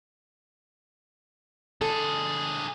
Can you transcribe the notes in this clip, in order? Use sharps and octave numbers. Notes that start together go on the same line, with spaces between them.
D3 G#4 A4